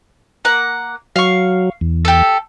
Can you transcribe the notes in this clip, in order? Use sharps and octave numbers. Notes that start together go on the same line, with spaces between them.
A#3 F#5
F#3 F5 C#6
E2
G4 A4